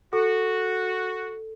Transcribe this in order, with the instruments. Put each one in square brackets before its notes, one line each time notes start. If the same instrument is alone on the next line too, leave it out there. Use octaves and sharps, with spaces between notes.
[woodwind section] F#4 [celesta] A4